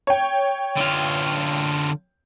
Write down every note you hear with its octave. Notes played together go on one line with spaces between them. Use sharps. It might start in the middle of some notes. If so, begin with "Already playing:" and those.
C#5 G5
D3 F4